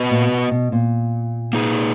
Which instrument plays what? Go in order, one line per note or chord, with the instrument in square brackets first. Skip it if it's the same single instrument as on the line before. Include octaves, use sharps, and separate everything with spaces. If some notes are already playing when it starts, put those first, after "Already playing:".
Already playing: [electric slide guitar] B3 F#4 B4 D#5
[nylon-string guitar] A#2
B2
B2
A#2
[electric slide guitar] A#3 D#4 G#4 B4